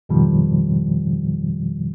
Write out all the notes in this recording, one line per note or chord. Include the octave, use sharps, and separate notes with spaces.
F2 G#2 B2 D#3 F3 G3